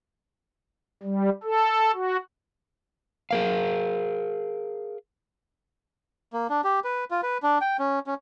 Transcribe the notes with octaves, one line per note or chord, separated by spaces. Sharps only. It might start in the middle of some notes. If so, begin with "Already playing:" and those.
G3
A4
F#4
G#4 A#4 F5
A#3
D4
G4
B4
F4
B4
D4
G5
C#4
C#4